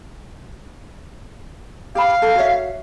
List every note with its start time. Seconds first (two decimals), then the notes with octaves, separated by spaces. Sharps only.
1.95 G4 F5 B5
2.22 A4
2.35 F#4 C#5 E5